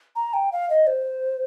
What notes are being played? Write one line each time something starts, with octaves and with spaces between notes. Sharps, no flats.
A#5
G5
F5
D#5
C5